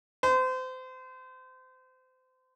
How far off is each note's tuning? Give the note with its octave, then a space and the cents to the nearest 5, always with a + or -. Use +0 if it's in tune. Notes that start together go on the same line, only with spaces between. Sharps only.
C5 -30